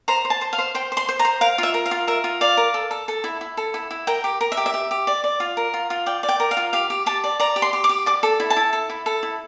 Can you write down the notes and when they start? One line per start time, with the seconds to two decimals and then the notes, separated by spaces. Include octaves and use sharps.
0.08 C5 A#5
0.25 C5
0.30 A5
0.41 C5
0.53 F5
0.58 C5
0.75 C5 G5
0.92 C5
0.97 C6
1.09 C5
1.19 A#5
1.25 C5
1.41 A#4 F5
1.58 F4 E5
1.74 A#4
1.86 F5
1.91 F4
2.07 A#4 E5
2.24 F4
2.41 D5 F5
2.57 A#4
2.74 A4
2.91 A4
3.08 A4
3.24 E4
3.41 E4
3.57 A4
3.74 E4
3.91 E4
4.07 A#4 G5
4.24 G4
4.41 A#4
4.52 E5
4.57 G4
4.66 E5
4.74 G4
4.91 G4
5.07 D5
5.24 D5
5.40 F4
5.57 A#4
5.74 F4
5.90 F4
6.06 D5 G5
6.23 D5
6.29 G5
6.40 A#4
6.51 F5
6.57 F4
6.73 G4 F5
6.90 G4
7.06 G4 A5
7.24 D5
7.40 D5 A#5
7.56 G4
7.62 C6
7.73 G4
7.84 D6
7.89 G4
8.06 D5 D6
8.23 A4
8.40 E4
8.50 A5
8.56 E4
8.73 A4
8.89 E4
9.06 A4
9.23 E4